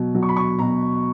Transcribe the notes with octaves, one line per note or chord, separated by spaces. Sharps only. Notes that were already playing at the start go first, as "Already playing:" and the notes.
Already playing: B2 F#3
F#3
C#6
B5
C#6
B2 A#5